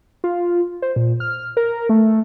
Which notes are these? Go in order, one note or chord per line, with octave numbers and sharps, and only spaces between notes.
F4
C5
A#2
F6
A#4
A3